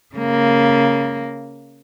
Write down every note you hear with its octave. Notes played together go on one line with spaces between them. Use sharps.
C#3 A#3